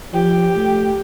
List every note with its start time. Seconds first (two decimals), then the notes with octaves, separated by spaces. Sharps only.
0.13 F3 G4
0.56 A3